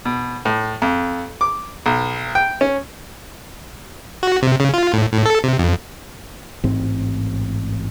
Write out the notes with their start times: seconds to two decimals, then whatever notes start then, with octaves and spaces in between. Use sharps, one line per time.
0.05 B2
0.45 A2
0.82 F2
1.41 D6
1.86 B1
2.35 G5
2.61 C#4
4.23 F#4
4.42 C3
4.60 C#3
4.73 F4
4.93 A2
5.13 A2
5.25 A4
5.44 C3
5.59 F2
6.64 A1 G#2 C4